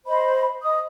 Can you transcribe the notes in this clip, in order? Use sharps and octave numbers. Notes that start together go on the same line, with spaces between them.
C5 D#5 B5
D#5 D#6